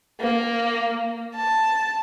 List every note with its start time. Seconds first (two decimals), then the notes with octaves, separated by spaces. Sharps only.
0.21 A#3
1.35 A5